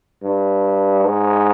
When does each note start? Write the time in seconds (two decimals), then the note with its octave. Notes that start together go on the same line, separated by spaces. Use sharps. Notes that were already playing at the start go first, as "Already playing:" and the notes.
0.23 G2
1.06 G#2